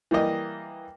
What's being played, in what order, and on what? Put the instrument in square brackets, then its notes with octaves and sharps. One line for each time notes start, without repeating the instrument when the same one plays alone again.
[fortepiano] E3 G3 A#3 D#5